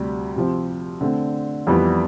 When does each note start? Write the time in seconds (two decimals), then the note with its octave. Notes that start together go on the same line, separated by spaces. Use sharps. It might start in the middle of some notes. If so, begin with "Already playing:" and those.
Already playing: D2 C3 G3
0.36 C3 F3 C4
1.01 D3 A3 C4
1.67 F2 E3 G3 B3